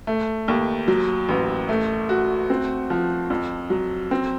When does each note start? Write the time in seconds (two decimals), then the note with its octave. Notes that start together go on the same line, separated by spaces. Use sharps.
0.07 A3
0.48 D#2
0.88 F#3
1.29 A1
1.69 A3
2.09 F#4
2.50 C4
2.90 F3
3.30 F2
3.70 F#3
4.11 C4